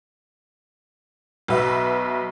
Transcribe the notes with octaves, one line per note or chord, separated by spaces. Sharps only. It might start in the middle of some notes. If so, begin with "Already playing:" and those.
B1 B2 B4 E5